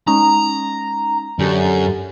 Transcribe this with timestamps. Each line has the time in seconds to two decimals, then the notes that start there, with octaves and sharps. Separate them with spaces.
0.07 G#3 C#4 D#4 A#5
1.39 F#2 D3 G4 A4